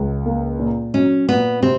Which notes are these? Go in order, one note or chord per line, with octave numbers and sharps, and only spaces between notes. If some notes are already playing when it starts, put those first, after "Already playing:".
Already playing: C#2
A#3
A#2
F#3 C#4
A#2 B3
C3 C4